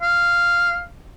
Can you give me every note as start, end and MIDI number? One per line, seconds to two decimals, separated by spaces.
0.03 0.82 77